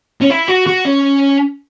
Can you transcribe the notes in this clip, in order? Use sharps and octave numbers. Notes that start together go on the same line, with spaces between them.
C#4
E4
F#4
F#4
C#4